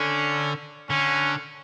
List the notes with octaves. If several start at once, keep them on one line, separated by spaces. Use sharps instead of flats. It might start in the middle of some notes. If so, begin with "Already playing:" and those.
Already playing: D3 C#4
D3 C#4